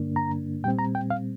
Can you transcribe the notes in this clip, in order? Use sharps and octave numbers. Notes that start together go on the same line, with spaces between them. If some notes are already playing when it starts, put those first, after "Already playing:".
Already playing: G2 D3 A#3 D4
A#5
A#2 G3 C4 G5
A#5
G5
F5